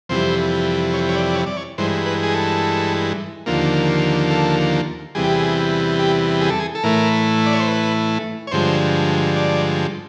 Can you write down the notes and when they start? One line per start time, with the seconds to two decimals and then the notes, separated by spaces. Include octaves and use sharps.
0.09 F2 C3 E3 G3 C5
0.94 C#5
1.09 C#5
1.15 D5
1.26 D5
1.35 C#5
1.47 D5
1.57 C#5
1.78 G2 E3 G#3 C5
2.06 B4
2.23 G#4
2.34 A4
3.46 D#2 D3 F3 A#3
4.30 A4
5.15 E2 C3 E3 G3 G#4
5.24 G4
5.34 G#4
5.99 G4
6.41 G#4
6.50 A4
6.59 G#4
6.75 A4
6.84 A2 E3 A3 A#4
7.46 D5
7.53 C#5
7.60 C5
7.68 B4
8.47 C#5
8.51 G2 D3 F3 G#3 C5
9.36 D5